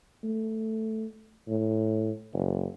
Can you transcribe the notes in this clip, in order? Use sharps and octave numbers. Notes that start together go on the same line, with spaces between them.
A3
A2
F#1